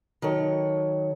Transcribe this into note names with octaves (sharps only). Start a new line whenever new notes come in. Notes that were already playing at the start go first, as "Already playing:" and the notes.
D#3 F#3 A4 C#5